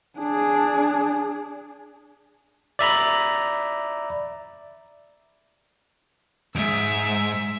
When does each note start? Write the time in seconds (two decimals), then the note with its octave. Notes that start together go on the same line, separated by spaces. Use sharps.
0.18 D4 G#4
2.79 D5 E5 A#5 B5
6.55 F2 G#2 E5